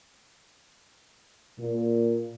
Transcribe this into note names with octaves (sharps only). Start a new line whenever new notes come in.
A#2